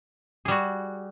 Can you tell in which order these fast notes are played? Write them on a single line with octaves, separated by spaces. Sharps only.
G#4 G3 F#4